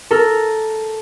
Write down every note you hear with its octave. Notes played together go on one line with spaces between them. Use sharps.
A4 A#4